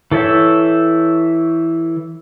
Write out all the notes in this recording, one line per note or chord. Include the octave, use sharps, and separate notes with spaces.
E3 A4 C#5 E5 G5